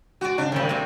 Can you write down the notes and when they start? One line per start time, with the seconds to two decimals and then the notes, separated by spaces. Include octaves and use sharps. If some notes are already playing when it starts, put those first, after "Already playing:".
0.21 G#3 F#4 D5
0.38 C#3 D4
0.52 A2 C3 D#3 G3
0.69 A3 C4